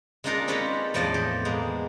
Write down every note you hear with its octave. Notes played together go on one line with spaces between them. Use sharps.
G#3 A#3 D4 D#4 F4 A#4
C4 C#4 G4 A4 B4 C#5
E2 A2 F3 A4 D5 D#5
G4
G#3 A#3 B3